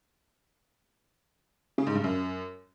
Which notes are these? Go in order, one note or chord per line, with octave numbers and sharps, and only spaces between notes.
C#3
G#2
G2
F#2